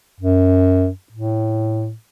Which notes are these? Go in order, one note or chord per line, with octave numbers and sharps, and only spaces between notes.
F#2
A2